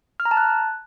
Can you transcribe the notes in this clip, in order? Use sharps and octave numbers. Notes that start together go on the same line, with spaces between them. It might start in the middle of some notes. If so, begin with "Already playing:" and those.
F6
A#5
A5
F#6